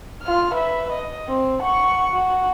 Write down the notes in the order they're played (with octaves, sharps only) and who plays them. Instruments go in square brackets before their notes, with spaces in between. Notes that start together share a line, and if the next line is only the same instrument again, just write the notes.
[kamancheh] F4 F6
B4 E5
D#5
C4
F#5 C#6
F#4